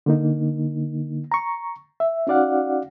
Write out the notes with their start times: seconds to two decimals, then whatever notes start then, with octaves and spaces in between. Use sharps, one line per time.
0.06 D3 A#3 D#4
1.32 A#5 C#6
2.00 E5
2.27 C#4 D#4 F#4 D5 F5 F#5